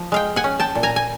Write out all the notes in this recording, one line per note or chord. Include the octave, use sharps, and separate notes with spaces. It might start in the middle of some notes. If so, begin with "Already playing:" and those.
Already playing: F3
G#3 F5 G5
F#5 G#5
C#4
G5 A5
A#2
G#5 A#5
G#5